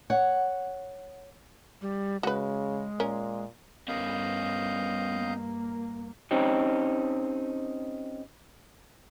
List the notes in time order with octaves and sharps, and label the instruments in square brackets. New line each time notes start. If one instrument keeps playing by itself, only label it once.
[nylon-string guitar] C#5 F#5
[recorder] G3
[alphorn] C#3 [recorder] G#3 [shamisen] F#4 B4
[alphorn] A#2 [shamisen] C#4 A#4
[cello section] G2 [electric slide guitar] B3 C#4 A#4 [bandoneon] D#5 F5 G6
[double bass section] A#3
[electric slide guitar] C4 C#4 D#4 G4